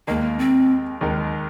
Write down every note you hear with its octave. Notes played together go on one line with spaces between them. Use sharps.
D#2 D#3 G#3 A#3 D#4 A#4
C4
D#2 D#3 G#3 D#4 A#4